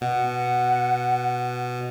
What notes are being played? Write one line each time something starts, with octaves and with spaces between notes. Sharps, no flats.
B2 F#5